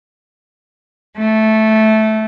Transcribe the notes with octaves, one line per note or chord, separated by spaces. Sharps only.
A3